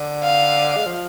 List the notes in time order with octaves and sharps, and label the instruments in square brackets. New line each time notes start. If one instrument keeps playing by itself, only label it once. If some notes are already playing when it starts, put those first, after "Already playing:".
Already playing: [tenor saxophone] D3
[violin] F5
[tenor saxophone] G#3
F3